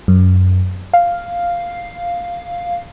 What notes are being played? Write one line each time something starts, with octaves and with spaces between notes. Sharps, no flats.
F#2
F5